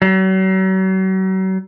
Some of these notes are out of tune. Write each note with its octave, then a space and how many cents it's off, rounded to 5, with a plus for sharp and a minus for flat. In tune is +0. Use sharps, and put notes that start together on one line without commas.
F#3 +40